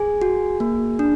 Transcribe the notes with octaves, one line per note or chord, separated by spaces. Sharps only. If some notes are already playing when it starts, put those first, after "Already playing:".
Already playing: G#4 G#5
F#4
A#3
D4